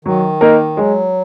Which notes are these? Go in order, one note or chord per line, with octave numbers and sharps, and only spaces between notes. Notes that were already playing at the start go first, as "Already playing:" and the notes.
D#3 F#3
A#3 D#4 A#4
F#3 G#3